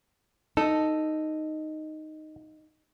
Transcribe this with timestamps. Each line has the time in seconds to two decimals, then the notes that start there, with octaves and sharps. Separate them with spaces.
0.57 D#4 A4